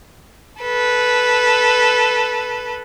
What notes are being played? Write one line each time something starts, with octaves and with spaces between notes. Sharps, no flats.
A4 B4